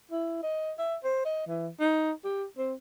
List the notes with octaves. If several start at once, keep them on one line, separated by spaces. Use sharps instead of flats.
E4
D#5
E5
C5
D#5
E3
D#4
G4
C4